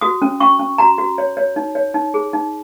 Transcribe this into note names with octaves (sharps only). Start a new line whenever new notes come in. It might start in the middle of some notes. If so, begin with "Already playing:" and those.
F#4 D#6
C#4
C#4 C#6
C#4
F#4 A#5
F#4
C#5
C#5
D#4
C#5
D#4
G#4
D#4